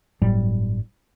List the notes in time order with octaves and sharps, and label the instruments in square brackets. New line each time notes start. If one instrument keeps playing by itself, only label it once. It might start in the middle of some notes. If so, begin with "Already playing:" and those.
[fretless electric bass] G1 A2 F#3 G3